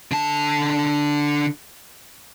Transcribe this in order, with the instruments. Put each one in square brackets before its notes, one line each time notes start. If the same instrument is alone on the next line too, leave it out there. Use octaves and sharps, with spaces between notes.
[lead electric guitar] D3 A5